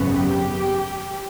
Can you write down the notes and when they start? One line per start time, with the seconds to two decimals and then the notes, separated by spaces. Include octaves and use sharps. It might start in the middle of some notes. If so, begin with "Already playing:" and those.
Already playing: G#1 F#2 C#3 F#3 B3
0.14 G4